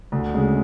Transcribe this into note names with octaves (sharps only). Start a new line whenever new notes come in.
D2
C#3 G#3